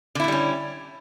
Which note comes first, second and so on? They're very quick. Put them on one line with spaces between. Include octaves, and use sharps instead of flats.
D3 E4 A3 G3 C#4